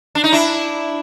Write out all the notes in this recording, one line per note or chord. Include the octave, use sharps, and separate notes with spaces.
D4
D#4
D4 E4